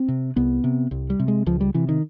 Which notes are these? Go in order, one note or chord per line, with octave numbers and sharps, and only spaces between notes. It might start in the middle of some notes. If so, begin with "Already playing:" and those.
Already playing: C4
C3
C2 B3
C3
C2
G3
C3
G#3
C#2 F3
G3
C3 E3
D#3